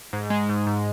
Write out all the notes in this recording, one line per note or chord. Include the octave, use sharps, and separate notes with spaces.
G#2
G#3
G#2
G#2